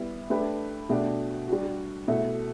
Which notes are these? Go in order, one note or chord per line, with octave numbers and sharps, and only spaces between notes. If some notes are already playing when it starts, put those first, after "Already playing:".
Already playing: G3 B3 E4
A3 D4 G4 B4
B2 A3 D4 G4
G3 D4 F#4
B2 A3 E4 A4